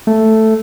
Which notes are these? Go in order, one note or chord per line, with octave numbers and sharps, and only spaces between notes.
A3